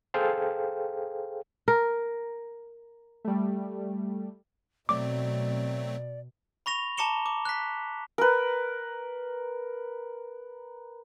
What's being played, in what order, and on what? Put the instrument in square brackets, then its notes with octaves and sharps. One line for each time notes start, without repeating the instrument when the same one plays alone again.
[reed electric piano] G#4 A4 C5 F5 G5
[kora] A#4
[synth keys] G3 A3
[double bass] B2 [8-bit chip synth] F#3 A3 C4 [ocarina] D5 [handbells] D6
[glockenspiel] B5 C#6 A#6 F7
A5 A#5 D6 C#7 E7 G7
D6
F#6 B6
[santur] A#4 B4